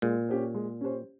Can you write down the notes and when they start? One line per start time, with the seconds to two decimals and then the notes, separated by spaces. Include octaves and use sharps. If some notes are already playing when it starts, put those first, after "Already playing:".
0.02 A#2 G#3
0.29 C#4 G4 C5
0.54 G#3
0.81 C#4 G4 C5